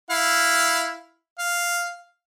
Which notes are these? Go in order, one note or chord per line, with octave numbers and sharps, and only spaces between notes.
E4 F5
F5